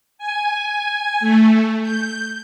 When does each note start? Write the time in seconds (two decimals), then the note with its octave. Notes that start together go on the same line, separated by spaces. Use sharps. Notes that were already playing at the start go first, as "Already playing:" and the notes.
0.18 G#5
1.20 A3
1.82 G6